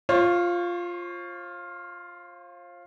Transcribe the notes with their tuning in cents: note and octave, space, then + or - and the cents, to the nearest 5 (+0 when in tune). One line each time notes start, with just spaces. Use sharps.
F4 +0 C5 +40 C#6 +0